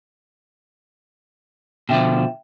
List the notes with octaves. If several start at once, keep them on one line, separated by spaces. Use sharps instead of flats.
B2 D3 F3 E5 G5 E7